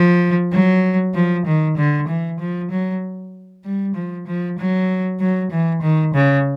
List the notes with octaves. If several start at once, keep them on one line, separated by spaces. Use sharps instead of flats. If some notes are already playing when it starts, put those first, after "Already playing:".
Already playing: F3
F#3
F3
D#3
D3
E3
F3
F#3
G3
F3
F3
F#3
F#3
E3
D#3
C#3